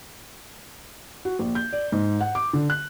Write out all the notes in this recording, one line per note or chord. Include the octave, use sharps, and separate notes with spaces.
F#4
A#1
G6
D5
G#2
F#5
D6
D3
F#6